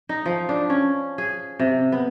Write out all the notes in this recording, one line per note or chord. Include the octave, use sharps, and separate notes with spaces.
D#4
F3
D4
C#4
G#4
C3
B3